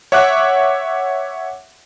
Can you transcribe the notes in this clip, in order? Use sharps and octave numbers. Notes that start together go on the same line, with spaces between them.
C#5 E5 F#5 D6 F#6